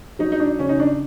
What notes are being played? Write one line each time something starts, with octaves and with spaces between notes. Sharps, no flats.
F#3 D#4
D#4
D4
C#3 C#4
D#4
D4